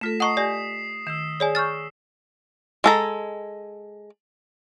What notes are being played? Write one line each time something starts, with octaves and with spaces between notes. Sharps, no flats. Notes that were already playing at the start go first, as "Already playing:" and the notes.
A3 F4 A4 A#6 B6 E7
D#5 F#5 A5 A#5 C#6 D#6 C7
G4 D5 G#5 A#6
D#3 E6 C7 E7
G#4 C#5 D5 G#5
G#5 C#6 F6 G6 A6
G#3 A4 A#5